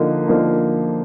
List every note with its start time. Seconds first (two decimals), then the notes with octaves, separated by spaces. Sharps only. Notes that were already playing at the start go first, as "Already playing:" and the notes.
Already playing: D3 F3 A#3 D#4
0.28 D3 F3 A#3 D#4